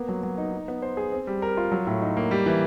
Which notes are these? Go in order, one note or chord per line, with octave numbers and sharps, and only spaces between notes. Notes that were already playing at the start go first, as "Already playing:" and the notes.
Already playing: A#3 B3
F#3
F#3
D#4
D#4
B3
C5
G#4
C4
G3
A#4
F4
F#3
A2
D#4
A#3
G3
E3